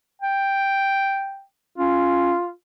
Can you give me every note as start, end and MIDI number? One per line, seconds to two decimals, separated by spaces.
0.22 1.43 79
1.78 2.33 61
1.78 2.49 65